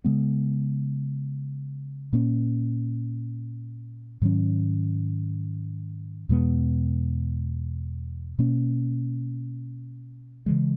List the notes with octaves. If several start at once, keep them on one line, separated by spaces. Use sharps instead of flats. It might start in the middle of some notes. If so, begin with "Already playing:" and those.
C#3 G#3 B3
A#2 A#3 C#4
G#2 D#3 F#3 C#4
E2 B2 G#3 B3
B2 A#3 C#4
C#3 E3 G#3